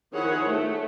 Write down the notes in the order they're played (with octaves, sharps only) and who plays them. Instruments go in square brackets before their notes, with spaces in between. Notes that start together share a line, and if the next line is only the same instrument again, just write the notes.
[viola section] D#3 F3 E4 G#4 C#5 F#5
A3